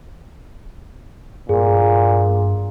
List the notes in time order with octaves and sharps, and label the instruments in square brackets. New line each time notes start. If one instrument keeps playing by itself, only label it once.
[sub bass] G2 [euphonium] A#2 [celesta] G#4